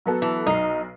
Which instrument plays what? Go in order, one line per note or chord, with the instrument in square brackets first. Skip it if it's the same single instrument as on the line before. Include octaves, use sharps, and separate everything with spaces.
[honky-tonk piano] F#3 B3 A4
[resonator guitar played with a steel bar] E3
[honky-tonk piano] B1 C7 [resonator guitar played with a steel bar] D#4